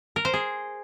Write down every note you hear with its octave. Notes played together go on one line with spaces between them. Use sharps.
A#4
C5
G#4